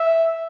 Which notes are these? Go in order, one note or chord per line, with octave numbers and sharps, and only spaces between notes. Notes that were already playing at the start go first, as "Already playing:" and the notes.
Already playing: E5